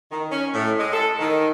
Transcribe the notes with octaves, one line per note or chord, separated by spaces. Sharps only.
D#3
C#4
A2
G#3
A4
D#3